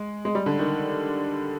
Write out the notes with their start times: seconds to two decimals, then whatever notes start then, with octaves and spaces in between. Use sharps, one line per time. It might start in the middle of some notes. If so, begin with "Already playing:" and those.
Already playing: G#3
0.25 G#3
0.35 G3
0.46 D3
0.59 D#3